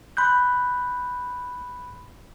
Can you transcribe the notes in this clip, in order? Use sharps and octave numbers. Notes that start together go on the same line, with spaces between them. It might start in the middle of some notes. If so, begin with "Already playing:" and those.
B5 C6 F#6 G6